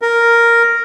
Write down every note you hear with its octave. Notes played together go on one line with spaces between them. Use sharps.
A#4